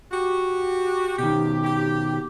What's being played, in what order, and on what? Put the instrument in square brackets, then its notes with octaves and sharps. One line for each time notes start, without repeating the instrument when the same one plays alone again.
[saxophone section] F#4 G4
[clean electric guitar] B2 D#3 [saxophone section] G4
[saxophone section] G4